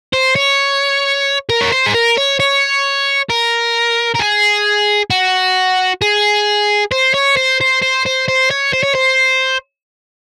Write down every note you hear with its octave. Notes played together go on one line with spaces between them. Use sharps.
C5
C#5
A#4
C#5
C5
G#4
A#4
C#5
C#5
A#4
A#4
G#4
F#4
G#4
C5
C#5
C5
C5
C5
C5
C5
C#5
C5
C#5
C5